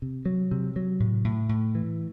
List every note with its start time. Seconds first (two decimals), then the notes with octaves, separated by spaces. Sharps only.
0.02 C3
0.26 F#3
0.51 C3
0.76 F#3
1.00 A2
1.24 A2
1.49 A2
1.75 E3